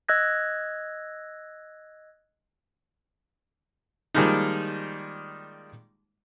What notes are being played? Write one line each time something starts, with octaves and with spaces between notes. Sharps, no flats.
D#5 E6 F#6 G#6 A#6
D#3 F3 G3 G#3 A#3 D#4